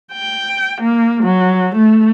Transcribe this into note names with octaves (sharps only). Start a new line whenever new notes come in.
G5
A#3
F#3
A3